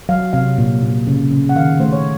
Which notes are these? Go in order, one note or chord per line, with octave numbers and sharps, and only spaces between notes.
F#3 F5
C3 F5
A#2
A#2
C#3
C#3
F#5
D#3 F5
A3 C5
C#5